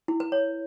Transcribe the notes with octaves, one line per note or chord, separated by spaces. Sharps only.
E4
B4
C#5